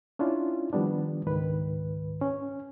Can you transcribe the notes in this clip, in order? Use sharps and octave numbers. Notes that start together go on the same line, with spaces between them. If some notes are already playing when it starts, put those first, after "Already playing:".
C#4 D4 E4 F4
D#3 F3 G3 B3 D4
C#2 G#2 D#3 B4
C#4